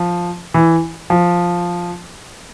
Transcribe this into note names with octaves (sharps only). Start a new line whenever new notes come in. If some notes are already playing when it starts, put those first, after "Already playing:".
Already playing: F3
E3
F3